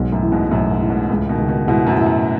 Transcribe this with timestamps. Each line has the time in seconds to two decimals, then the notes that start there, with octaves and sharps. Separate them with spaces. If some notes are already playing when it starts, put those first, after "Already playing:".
Already playing: B1 G#2
0.12 F#2 A2
0.22 E3
0.32 G#2 B2
0.51 B1 F#2 A2
0.71 G#2
0.80 E3
0.90 G#2 B2
1.10 C#2 A2 C#3
1.29 B2 D#3
1.38 C#2
1.48 B2 D#3
1.67 G#2 B2 E4
1.87 F#2 A2
1.97 E4
2.06 F#2